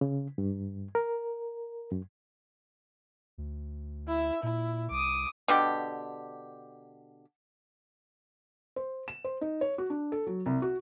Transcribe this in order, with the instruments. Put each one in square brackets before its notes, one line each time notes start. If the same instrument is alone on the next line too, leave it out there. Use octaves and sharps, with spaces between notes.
[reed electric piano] C#3
G2
A#4
F#2
[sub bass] D2
[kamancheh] E4 E5
[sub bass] A#2 [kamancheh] E4
[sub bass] C2 [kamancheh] D6 D#6
[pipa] B2 D3 G4
[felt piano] C5
E7
C5
D#4
C#5
F#4
D4
A4
F#3
C2
F#4